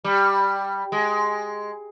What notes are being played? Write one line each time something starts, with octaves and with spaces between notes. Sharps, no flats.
G3
G#3